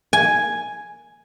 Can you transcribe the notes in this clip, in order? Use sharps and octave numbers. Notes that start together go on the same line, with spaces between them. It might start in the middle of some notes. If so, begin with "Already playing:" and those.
G#5